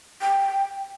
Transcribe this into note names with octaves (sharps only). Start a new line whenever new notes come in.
G5